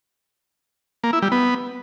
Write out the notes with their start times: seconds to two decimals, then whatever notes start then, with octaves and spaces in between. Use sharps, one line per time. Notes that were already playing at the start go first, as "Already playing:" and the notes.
1.04 A#3
1.13 E4
1.22 G3
1.32 B3